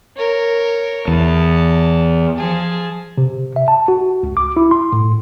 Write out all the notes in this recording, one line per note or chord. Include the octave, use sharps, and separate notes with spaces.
A#4 C#5
E2 A5
F3 G#4 A5
C3
E5
A5
F#4
C#2
D6
E4
C6
A2